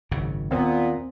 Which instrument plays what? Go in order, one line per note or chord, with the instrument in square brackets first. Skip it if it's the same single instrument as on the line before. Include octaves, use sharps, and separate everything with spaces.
[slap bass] G#1 F#2 C#3
[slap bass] D#2 [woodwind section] A#2 B3 [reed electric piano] C4